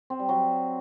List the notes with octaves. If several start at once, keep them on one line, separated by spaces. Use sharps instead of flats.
C4
G3
F#3